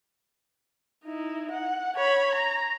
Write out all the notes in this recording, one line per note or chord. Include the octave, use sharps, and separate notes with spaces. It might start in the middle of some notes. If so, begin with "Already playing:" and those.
D#4 E4
F#5
C#5 B5
A#5